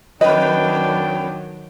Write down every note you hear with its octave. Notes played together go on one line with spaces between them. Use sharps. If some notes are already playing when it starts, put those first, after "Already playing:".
F2 D#3 F#3 D4 B4 D#5 G5